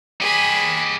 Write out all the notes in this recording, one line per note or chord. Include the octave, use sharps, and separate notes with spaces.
G4 G#4 D#5 B5